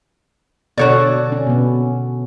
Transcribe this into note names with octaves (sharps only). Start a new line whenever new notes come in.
B2 D3 F#4 A4 C#5 D5
C#4
B2 B3